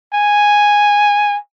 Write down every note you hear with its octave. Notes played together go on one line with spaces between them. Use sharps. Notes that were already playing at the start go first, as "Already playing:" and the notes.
G#5